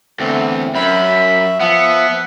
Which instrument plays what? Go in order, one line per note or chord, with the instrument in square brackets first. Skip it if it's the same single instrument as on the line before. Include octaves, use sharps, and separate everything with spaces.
[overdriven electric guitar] E2 [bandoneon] D3 A3 C4
[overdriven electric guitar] F#2 [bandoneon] E5 [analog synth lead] B5
[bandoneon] F3 E5 [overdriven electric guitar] B3 [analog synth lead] F#5